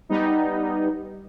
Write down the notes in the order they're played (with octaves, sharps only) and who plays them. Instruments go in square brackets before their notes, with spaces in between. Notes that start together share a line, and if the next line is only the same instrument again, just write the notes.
[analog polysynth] G3 B3 D#4